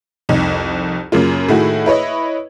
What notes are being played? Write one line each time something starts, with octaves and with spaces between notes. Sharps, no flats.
C2 F2 D#4
F#2 C#3 A#3 F4
A2 D#3 A3 E4 F#4 G#4
E4 B4 C#5 D#5